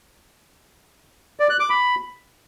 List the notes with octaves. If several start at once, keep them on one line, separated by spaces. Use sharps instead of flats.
D5
F#6
D6
B5